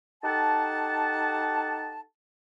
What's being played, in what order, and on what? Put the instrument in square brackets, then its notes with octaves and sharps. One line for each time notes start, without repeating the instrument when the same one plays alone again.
[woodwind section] D#4 G4 A4 F#5 A5